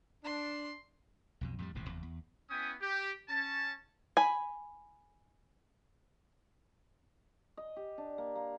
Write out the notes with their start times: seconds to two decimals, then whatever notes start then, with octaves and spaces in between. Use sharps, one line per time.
0.24 D4 C6
1.41 B1 F2 B2
1.58 F2 A2 C#3 G3
1.75 D#1 A1 G#2 C3
1.89 F#1 E2
2.03 E2
2.50 B3 C#4 E4 G5 G#5 D#6
2.81 G4
3.29 C#4 A5
4.17 G#5 B5
7.57 D#5
7.76 G4
7.98 D4
8.18 A#3
8.35 A#3